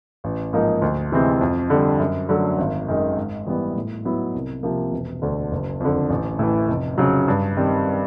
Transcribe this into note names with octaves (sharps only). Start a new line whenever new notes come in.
A1
G#2 F3 A#3 D#4
D2
C3 E3 G#3 C4
F2
D3 G3
F#2
D3 F#3 A3
G#1
F#2 D#3 G#3
G#2
E3 G3 B3
A2
F#3 B3 E4
C2
C3 F3 A#3
E1
D2 D3
F#1
F2 D3
A1
A2 E3
F1
F2 C#3 F#3
G2
D#3 G3 C4